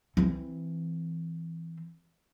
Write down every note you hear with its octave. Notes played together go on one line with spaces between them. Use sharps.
E3 C4